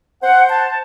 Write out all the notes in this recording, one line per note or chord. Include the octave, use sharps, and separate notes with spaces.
C5 F#5
A5